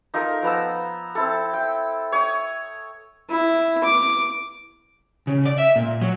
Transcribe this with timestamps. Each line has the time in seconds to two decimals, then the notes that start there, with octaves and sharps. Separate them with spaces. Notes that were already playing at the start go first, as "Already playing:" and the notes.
0.14 D#4 F4 A4 A#4
0.43 F3 B3 A#5 E6
1.15 C4 E4 A4
1.53 G5
2.12 C#5 D#6
3.30 E4
3.84 D6
5.27 C#3
5.45 D5
5.58 E5
5.76 A#2
6.02 F#3